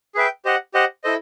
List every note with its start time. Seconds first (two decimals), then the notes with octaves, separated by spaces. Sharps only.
0.15 G#4 B4 E5 G5
0.45 G4 C5 D#5 F#5
0.74 G4 C5 D#5 F#5
1.04 E4 A4 C5 D#5